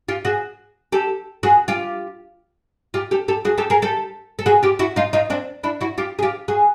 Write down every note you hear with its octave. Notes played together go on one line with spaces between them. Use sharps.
F4 G4
F#4 G#4
G4 A4
F#4 G#4
F4 G4
F4 G4
G4 A4
G4 A4
F#4 G#4
G4 A4
G#4 A#4
G4 A4
A4
F#4 G#4
F4 G4
E4 F#4
D#4 F4
D#4 F4
C4 D4
D4 E4
E4 F#4
F4 G4
G#4
F4 G4
F#4 G#4